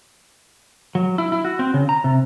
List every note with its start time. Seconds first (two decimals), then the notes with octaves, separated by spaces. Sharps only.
0.95 F#3
1.18 E4
1.32 E4
1.45 F#4
1.59 C4
1.74 C#3
1.89 A#5
2.04 C3